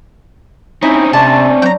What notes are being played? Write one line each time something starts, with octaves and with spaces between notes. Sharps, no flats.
C4 C#4 D#4 E4
C3 A3 D4 A5
F#3 G5 A#5